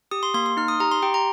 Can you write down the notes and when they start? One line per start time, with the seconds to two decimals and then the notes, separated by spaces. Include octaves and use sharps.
0.11 G4 D#6
0.23 C6
0.34 A#3 C6
0.46 C6
0.57 D#4 F6
0.68 D#6
0.80 G4 A#5
0.91 C6
1.02 G4 G5
1.14 A#5